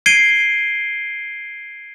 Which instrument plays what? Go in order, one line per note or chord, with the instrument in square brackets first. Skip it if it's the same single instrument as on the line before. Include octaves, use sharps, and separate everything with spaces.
[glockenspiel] G#6 C7 D7 D#7 G7